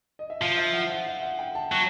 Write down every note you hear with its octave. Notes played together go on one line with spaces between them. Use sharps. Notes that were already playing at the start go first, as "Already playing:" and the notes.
D#5
E5
F3 F5
E5
F#5
F#5
E5
F#5
G5
A5
F#3